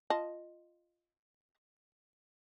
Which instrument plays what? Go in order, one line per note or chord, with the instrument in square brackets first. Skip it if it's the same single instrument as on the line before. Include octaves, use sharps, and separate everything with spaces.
[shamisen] F4 D#5 A5